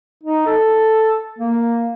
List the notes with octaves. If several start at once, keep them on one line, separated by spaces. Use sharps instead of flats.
D#4
A4
A#3